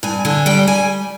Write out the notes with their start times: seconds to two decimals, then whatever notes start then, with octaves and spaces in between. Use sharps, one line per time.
0.03 G2 G#5
0.25 D3 G#5
0.46 G3 G5
0.67 G3 G#5